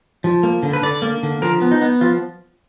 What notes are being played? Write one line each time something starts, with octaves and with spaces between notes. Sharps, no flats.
F3
A#3
D3
B4
D3 D5
A#3
D3
F3 A#4
B3
D#4
B3
F3 F4